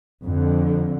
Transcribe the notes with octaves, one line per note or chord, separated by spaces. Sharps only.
F2 D3